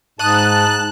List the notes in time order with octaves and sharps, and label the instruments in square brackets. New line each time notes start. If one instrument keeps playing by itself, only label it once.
[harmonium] G#2 [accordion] A5 [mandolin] D#6 [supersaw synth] F#6